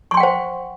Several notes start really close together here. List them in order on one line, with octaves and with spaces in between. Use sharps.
C#6 C6 G5 F#5 C5